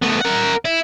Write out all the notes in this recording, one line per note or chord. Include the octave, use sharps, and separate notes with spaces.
A3 B3
A#4 F#5
E4